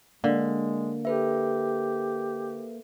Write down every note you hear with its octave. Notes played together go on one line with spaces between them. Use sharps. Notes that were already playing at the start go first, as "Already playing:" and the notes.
D3 G#3 A#3
G4 A4 B4 E5